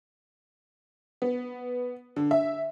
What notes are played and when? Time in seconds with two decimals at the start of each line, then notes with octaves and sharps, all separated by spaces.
1.22 B3
2.16 D3
2.31 E5